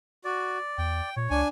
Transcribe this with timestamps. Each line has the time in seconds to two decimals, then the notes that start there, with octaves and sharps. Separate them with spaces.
0.25 F#4 D5
0.78 E2 G5
1.16 A#2 C#5
1.30 C#2 D4 G#5